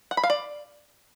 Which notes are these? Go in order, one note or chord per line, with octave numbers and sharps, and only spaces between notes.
F#5
B5
F5
D5